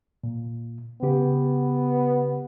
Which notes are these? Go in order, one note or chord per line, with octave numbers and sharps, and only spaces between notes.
A#2
C#3 B3 G4